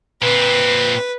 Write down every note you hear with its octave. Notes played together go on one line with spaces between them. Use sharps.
A#2 C4 B4